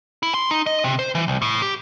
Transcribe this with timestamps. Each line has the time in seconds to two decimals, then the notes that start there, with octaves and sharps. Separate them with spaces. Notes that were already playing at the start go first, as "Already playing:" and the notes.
0.23 E4
0.34 C6
0.51 D#4
0.66 D#5
0.84 C3
0.99 C5
1.15 E3
1.28 C2
1.42 A2
1.62 G4